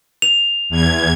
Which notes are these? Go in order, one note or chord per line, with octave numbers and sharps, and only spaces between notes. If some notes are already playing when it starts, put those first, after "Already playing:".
F7
E2 G#6